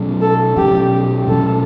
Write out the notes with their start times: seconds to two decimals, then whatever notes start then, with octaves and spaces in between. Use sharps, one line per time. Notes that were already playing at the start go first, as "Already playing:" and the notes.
Already playing: B2 F#3 C#4
0.21 A4
0.57 B2 F#3 C#4 G4
1.28 B2 F#3 C#4 A4